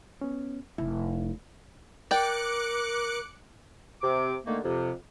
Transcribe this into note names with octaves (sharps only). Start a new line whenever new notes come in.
B3 C#4
F1 E4
A#4 D5 G5 D6 F#6 C#7
C3 D6
D3 D#3 A3 A#3
F2 C3